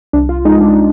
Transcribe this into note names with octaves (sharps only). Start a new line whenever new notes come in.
C2 D4
F4
G#3 D#4
D4